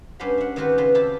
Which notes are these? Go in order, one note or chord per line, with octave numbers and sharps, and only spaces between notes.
G2 C#4 G4 C5 F#5 B5
E5 F#5
D#3 G#3 C4 F#4 G4 B4
C#3 B4 C6
C3 E4 G4 A5 B5